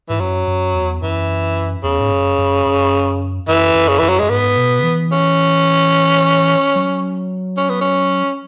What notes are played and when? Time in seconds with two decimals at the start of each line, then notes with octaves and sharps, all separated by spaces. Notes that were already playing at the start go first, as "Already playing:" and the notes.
0.09 G#2 E3
0.20 F#2 F#3
0.48 F#2
0.74 E2
1.02 F#2 E3
1.83 E2 C#3
2.00 G#2
2.11 F#2
2.38 F#2
2.66 F#2
3.48 F#2 E3
3.75 F#2
3.88 C#3
3.99 F#2 E3
4.09 F#3
4.19 F#2 G#3
4.29 G#2 B3
4.57 B2
4.79 C#3
4.84 E3
5.12 C#4
6.75 F#3
7.57 C#4
7.69 B3
7.81 C#4